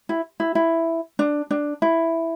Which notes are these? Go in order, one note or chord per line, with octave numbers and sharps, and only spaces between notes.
E4
E4
E4
D4
D4
E4